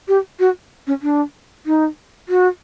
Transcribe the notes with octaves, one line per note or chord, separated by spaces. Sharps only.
G4
F#4
C#4
D4
D#4
F#4